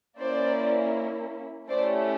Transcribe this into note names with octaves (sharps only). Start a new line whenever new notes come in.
A#3 C#4 E4 C5 D5
A3 C#4 E4 G4 C5 D5